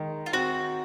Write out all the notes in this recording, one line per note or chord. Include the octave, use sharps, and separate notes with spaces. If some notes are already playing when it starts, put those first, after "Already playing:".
Already playing: D#3 G#3
F4
C4 F#4